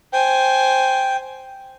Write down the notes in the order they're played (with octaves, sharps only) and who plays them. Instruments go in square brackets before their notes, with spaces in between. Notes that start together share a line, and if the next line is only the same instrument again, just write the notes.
[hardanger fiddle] C5 G#5 [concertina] G5